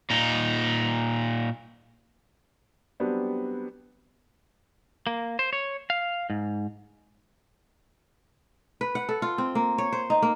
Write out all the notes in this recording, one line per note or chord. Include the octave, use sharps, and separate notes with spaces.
A#2 D#4
F#3 G3 B3 C4 D4
A#3
C5
C#5
F5
G#2
B4
F#5
A4
F4
C4
A#3
C#5
C5
D#4
A#3